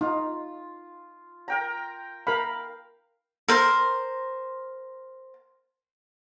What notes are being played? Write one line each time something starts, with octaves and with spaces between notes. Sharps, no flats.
D#4 F4
A#4 G5 A#5
A#4 F5 B5
A#4 C5